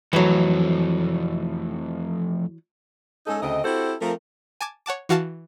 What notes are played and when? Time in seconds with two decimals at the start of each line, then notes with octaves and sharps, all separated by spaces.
0.13 F2 E3 F#3 A3
3.26 G#3 C#4 D#4 A4
3.42 D2 C#3 A3 C4 D#5
3.64 C4 E4 F#4 G4 A4 C5
4.01 F3 A3 C4 A#4
4.61 G#5 A5 D6 G#6
4.86 C#5 F#5 A5 D6
5.09 E3 F#4 F5 A5